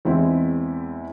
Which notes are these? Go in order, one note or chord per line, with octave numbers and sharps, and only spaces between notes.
E2 G#3 C4 E4